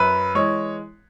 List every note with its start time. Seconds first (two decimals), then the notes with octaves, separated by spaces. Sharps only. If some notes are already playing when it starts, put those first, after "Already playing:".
Already playing: F#2 B4
0.35 E3 G#3 C#5